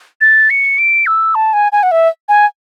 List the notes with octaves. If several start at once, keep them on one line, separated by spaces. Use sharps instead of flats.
A6
C#7
D7
E6
A5
G#5
G#5
F#5
E5
G#5